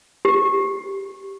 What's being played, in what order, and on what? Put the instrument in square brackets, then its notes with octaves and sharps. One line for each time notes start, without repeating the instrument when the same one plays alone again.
[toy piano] G4